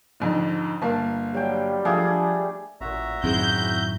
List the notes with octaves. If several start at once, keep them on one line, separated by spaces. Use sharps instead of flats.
F2 G#2 D3
G1 A#3 A5
F#3 G3 G5
F3 A3 D4 G#4
A1 A#2 F#4 E5 A#5
F#2 A2 D#3 C4 E4 G#4 G6